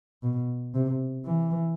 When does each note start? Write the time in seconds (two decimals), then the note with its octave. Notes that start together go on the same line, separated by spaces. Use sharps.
0.23 B2
0.74 C3
1.25 E3